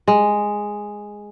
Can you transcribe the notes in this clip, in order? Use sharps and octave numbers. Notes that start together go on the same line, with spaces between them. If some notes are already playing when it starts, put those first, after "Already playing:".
G#3